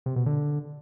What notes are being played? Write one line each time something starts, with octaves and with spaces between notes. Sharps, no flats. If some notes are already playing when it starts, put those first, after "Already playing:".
C3
B2
D3